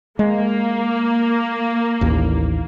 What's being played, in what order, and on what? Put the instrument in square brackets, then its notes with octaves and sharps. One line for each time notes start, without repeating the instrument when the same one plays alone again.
[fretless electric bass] G#3 [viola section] A#3
[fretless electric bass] A1 D#2